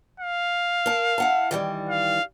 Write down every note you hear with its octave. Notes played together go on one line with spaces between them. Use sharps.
F5
A#4 A5
E4 F#5 A5
D#3 E3 G3
F5